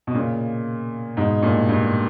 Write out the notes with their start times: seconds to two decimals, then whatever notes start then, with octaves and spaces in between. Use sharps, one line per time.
0.07 B2
0.14 A#2 C#3
1.17 G#2 B2
1.42 G2 A#2
1.69 G2